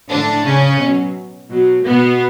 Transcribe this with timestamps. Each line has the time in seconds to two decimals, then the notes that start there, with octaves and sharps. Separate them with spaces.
0.10 A2 D3 F3 D4
0.45 C#3 C#4
0.80 B2 F#3
1.50 B2 F#3
1.85 B2 B3